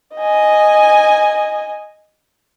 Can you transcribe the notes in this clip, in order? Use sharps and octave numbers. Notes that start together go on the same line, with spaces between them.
D#5 G#5